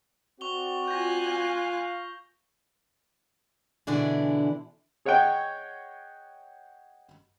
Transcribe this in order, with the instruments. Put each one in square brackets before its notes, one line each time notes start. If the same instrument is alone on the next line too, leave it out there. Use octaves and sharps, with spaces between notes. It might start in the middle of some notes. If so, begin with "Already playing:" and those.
[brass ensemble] C4 F#4 D5 [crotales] C#6 F7 G7
[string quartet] F4 G#5 F#6 [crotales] G6 A#6
[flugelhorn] F5
[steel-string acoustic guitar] B2 D3 E3 D4 E4 G#4
[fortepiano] G#4 C#5 D#5 F#5 G5